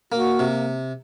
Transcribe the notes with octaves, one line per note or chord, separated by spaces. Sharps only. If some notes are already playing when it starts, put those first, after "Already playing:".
A#3 F#4
C3